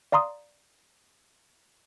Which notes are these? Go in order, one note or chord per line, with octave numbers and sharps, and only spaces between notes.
D5 F5 A#5 C6 D#6